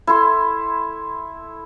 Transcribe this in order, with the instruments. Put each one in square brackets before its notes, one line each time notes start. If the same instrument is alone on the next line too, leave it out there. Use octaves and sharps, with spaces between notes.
[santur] E4 A4 C6